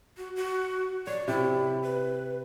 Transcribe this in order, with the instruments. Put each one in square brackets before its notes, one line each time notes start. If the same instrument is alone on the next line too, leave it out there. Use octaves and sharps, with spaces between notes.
[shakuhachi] F#4
F#4
[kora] C#5 [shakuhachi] D5
[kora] C3 [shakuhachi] E4
[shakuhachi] B4